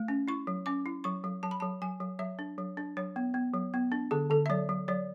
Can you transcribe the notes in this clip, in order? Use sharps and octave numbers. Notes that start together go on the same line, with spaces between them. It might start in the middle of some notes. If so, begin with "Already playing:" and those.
Already playing: A3
C#4
E4 C#6
F#3
C#4 D6
E4
F#3 C#6
F#3
F#3 A5
B5
F#3 A5
F#3 G#5
F#3
F#3 E5
D4
F#3
D4
F#3 C#5
B3
B3
F#3
B3
D4
D3 G#4
D3 A4
E5
F#3 D5
F#3
F#3 D5